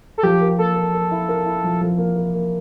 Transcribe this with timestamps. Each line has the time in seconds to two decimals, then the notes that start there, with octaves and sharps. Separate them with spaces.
0.18 A4
0.23 F3 G4
0.41 A#4
0.58 A#3 A4
0.76 A#4
0.93 A#4
1.11 E4
1.29 A#4
1.46 E4
1.64 F3
1.81 F3
1.98 A#3
2.16 A#4
2.34 A#3